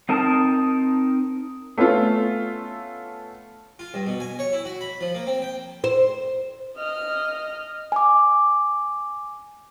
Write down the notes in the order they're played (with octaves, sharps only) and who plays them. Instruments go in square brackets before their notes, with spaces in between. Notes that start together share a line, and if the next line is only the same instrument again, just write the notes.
[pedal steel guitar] C4 D#4 A#4 A5 D#6
[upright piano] A3 B3 C#4 F4 A4
[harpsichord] F4
G2
B2
G#5
C#5
E4
F#4
B5
F3
A#3
C4
G5
[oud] C5
[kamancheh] D#5 F6
[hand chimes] G#5 D6